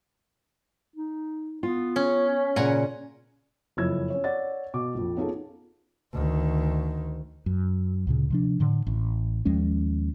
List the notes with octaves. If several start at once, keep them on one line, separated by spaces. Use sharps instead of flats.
D#4
B3 F4
C#4
A#2 C#3 C#4 F#5 G#5 A#5
F#1 F2 E4 C#5 E6 G#6
C#4 C#5
C#5 D5 F#5 A6
B2 D6
A#1 F2
B3 C#4 D#4 F4 G#4 A4
D2 D#3
F#2
D2 A#2 C#3
C3 F3 D4
A2 D3
A1
D#2 F3 G#3 C#4